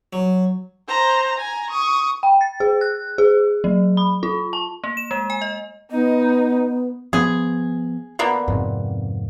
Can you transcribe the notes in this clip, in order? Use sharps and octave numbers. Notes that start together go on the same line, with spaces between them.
F#3
C5 A#5
G#5 A#5
C#6 D#6
G5
A6
G#4
F#6
G#4
F#3
B5
F4
A5
A#3
E7
G#3
G#5
D#5
B3 D#4 D#5
F3 B3 G#4
D3 A#3 B3
F2 G#2 C3